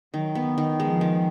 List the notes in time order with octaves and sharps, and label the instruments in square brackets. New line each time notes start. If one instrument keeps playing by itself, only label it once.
[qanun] D#3 [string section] F#3
[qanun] B3
D#3
[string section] F3 [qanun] G#3
[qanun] D#3